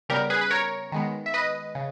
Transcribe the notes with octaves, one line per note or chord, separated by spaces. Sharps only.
C#3 G3 B3 G4 A#4
G#4 B4
B4
A#4 C#5
D#3 G#3 B3
E5
B4 D#5
C#3